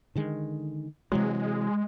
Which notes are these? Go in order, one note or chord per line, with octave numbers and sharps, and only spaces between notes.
D3 D#3 G#3
C3 E3 F#3 G#3